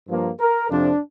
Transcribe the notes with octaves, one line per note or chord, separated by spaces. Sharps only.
G2 F3 A#3
A#4
F2 C3 F3 D4